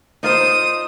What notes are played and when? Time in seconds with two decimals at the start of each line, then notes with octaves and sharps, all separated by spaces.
0.23 D#4 F4 C5 D#6